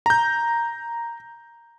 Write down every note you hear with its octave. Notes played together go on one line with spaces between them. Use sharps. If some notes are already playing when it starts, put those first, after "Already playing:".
A#5 G6